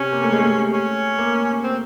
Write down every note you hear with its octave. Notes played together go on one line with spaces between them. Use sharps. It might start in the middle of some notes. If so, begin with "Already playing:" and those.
Already playing: C3 C#4
A#3
A3
G#3
A3
C#4
A#3
C4